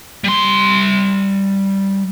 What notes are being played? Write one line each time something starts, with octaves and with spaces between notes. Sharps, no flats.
G3 C6